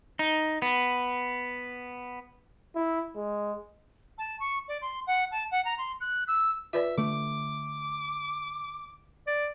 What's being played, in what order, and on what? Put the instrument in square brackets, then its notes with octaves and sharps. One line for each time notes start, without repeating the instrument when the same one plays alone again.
[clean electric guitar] D#4
B3
[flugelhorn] E4
G#3
[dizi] A5
C#6
D5
C6
F#5
A5
F#5
A#5
C6
F#6
E6
[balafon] F4 B4 D5 [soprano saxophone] E5
[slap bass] D3 A3 [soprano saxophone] D6
[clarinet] D5